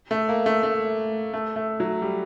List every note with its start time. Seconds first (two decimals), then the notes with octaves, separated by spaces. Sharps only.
0.11 A3
0.29 A#3
0.46 A3
0.63 A3
1.34 A3
1.56 A3
1.80 F#3
2.02 G3